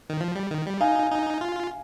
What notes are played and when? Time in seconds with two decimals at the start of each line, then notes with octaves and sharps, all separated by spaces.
0.10 D#3
0.21 F3
0.36 G3
0.51 D#3
0.66 G3
0.80 D#4 F5 G#5
1.11 D#4
1.41 F4